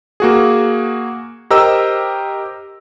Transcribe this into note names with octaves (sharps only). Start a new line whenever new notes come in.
A#3 F#4 G#4
G4 A#4 C5 D#5 A#5 E6